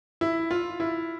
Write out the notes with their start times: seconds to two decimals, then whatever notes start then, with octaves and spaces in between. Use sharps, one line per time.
0.21 E4
0.51 F4
0.80 E4